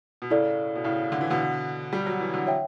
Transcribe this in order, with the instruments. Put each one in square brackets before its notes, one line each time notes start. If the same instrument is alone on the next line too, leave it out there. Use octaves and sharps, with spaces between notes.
[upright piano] B2
[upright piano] A2 C#3 [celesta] E4 A4 D5
[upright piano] B2
A2 C#3
D3
E3
B2 D3
G3
F#3
E3
D3 F#3
[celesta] C#5 E5 G5